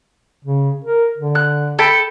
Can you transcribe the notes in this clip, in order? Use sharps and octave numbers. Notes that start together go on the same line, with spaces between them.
C#3
A#4
D3
F#6
A4 G5 B5